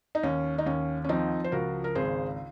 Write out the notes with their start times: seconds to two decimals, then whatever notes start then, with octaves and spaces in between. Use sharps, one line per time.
0.15 D#4
0.23 D#2 C#4
0.58 D#4
0.66 D#2 C#4
1.04 C#4
1.09 F3 C4 D#4
1.44 C5
1.52 C#2 F#4 A#4
1.84 A#4
1.95 G#1 G#4 C5